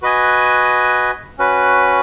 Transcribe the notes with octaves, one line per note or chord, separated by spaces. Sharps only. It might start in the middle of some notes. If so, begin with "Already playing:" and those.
F#4 B4 D#5 G#5
C#4 F#4 B4